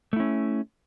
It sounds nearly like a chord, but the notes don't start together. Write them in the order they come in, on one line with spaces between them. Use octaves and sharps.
A3 E4 C#4